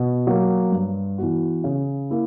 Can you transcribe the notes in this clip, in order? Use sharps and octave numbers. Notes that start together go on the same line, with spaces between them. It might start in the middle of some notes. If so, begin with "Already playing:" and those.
Already playing: B2
F#3 A#3
G2
E3 B3 F#4
C#3
A#3 E4